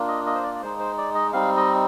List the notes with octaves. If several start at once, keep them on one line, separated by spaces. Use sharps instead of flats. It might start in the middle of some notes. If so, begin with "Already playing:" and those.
Already playing: A#3 D4 F4
D#5
D#5
C5
D5
D5
G#3 D#4 C5
C5
D5
D#5
G3 C4 D#4 F5
D#5